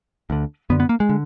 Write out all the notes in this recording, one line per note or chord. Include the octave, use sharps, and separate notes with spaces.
D2 D3
F#2 D3 B3
B3
A#3
G#3
D3